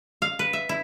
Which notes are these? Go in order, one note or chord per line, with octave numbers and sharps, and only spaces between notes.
F5
B4
E5
E4